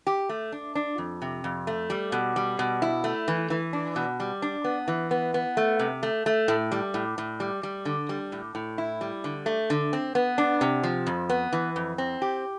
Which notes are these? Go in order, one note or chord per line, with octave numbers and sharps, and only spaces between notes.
G4
A3
D4
D4
F2
C3
F2
A3
G3
B2
G3
B2
E4
A3
E3
E3
D4
B2
G3
D4
B3
E3
B3
B3
A3
C3
A3
A3
A2
G3
A2
A2
G3
G3
D3
G3
A2
A2
E4
G3
D3
A3
D3
C4
B3
D4
C3
F3
F2
B3
E3
F2
C4
G4